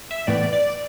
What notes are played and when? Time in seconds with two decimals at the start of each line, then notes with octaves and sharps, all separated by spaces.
0.11 E5
0.27 A2 E3 B3 D5
0.53 D5